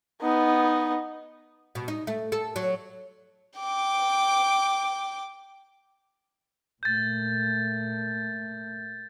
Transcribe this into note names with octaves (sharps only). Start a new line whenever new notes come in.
B3 D#4
B2
D#4
A3
A4
F#3
G5 D6
A#2 A3 G6 A6